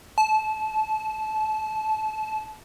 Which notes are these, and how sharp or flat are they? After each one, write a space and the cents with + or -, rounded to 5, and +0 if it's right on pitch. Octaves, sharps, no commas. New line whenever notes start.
A5 -25